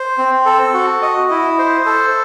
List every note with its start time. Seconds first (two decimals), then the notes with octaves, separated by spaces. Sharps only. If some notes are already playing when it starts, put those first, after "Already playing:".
Already playing: C5
0.18 C4
0.46 A4
0.74 F#4
1.02 D#5
1.31 E4
1.59 C5
1.86 A4